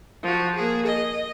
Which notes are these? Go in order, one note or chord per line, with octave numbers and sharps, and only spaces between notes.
F3 F#4
A#3 G#4
D#5